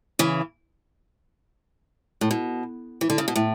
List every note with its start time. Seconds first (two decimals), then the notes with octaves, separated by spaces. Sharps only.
0.19 C#3 E3
2.21 A2
2.31 B2
3.01 E3
3.10 D3
3.18 C#3
3.28 B2
3.36 A2